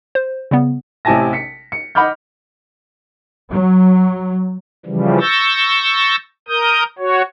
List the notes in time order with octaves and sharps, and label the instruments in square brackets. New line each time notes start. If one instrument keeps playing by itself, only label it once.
[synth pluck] C5
C#3 G3 B3
[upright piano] A1 C3 E4 G#5 A5 A#6
B6 C#7
C#7
D#5 F#5 B5 D6 F6 G6
[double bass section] F#3
[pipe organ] C#3 E3 F3 G3
C#6 E6 G6 A6 A#6
A#4 D#6 G6
F#4 C#5